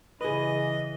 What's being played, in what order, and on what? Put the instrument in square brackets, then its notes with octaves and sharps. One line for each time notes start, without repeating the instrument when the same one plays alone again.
[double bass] C#3 E3 [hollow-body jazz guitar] G#4 B4 [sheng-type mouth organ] D#5